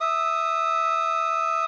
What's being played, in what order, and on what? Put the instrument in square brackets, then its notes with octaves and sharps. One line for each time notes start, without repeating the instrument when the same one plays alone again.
[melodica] E5 D#6